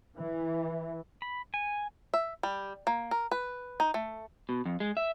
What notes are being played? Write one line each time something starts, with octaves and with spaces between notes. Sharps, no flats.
E3
B5
G#5
E5
G3
A#3
A#4
B4
D#4
A3
B2
F2
G#3
E5